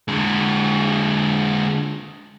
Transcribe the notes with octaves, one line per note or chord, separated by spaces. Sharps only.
D3 G#3